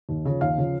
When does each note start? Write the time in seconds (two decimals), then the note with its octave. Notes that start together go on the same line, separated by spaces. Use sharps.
0.09 D#2
0.25 C#3 F3
0.41 D#2 F5
0.58 C#3 F3